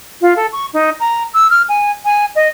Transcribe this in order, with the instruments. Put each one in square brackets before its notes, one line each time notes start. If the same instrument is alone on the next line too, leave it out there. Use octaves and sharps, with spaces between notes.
[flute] F4
A4
C#6
D#4
A#5
E6
F6
G#5
G#5
D#5